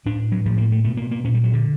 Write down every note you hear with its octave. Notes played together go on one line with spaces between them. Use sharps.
A2 D4
F#3
A2 F3
A#3
A3
B2 A3
A#3
A#3
A#2 C#4
G3
F#3
D3